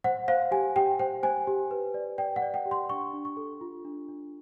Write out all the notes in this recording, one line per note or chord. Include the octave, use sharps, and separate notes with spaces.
C5 F#5
C5 F5
G4 G#5
G4 G5
C5 G5
C5 G#5
G4
B4
D5
D5 G5
F#5
D5
G5
G4
C6
D4 C#6
D4
C#6
A4
F4
D4
D4